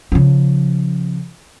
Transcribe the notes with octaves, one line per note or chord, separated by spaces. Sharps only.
C#3 F3